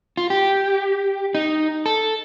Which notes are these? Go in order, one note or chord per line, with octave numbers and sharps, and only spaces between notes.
F4
G4
D#4
A4